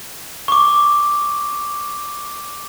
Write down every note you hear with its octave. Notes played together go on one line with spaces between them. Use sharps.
C#6 D6